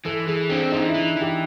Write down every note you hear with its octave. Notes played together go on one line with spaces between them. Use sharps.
E3 A4
E3 G#4
C4 D4
E3 D#4
E4
E3
E3
G4